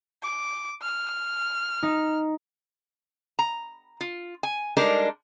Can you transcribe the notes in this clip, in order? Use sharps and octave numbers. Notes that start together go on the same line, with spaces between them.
D6
F6
D#4
A#5
F4
G#5
G3 G#3 D4 D#4 A4 A#4